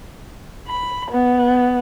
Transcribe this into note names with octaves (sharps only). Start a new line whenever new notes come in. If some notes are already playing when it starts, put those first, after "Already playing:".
B5
B3